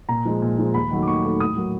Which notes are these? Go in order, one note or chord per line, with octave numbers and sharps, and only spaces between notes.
A#2 A#5
F3 G#3
A#2
F3 G#3
D#2 B5
D#3 F#3 A3
D6
D#2 C#6
D#3 F#3 A3
A2 D#6
F#3 A#3